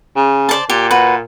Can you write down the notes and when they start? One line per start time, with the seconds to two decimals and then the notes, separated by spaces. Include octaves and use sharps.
0.16 C#3
0.49 C5 D5 A5
0.70 A#2 G4
0.91 F#4 B4